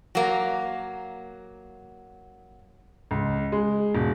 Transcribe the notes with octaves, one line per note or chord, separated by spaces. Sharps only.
F#3 A#3
C#2
G#3
E1